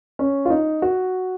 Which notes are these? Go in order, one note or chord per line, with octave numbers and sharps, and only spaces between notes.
C#4
F4
D#4
F#4